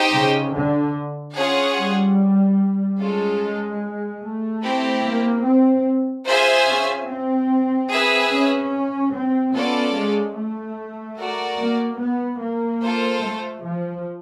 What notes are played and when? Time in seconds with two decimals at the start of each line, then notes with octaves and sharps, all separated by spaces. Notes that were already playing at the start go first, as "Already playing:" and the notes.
Already playing: D#4 G4 C5 D#5 G5
0.13 C#3
0.53 D3
1.36 C#4 F4 G#4 C#5 F#5
1.76 G3
2.99 G#3 C#4 F4 A4
4.22 A3
4.62 C4 E4 G4
5.04 A#3
5.45 C4
6.27 F4 G#4 C5 E5 G#5
6.67 C#4
7.08 C4
7.90 G#4 B4 E5
8.31 C#4
9.13 C4
9.54 B3 C#4 F4 A4 D5
9.95 G#3
10.35 A3
11.18 F#4 A#4 D5
11.58 A#3
11.99 B3
12.40 A#3
12.82 F4 A4 C5
13.23 A3
13.64 F3